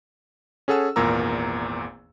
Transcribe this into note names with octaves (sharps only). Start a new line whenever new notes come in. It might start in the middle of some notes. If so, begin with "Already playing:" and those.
C#4 G#4 A4 F#5 E6
G#1 E2 A#2 A#4 A#5 E6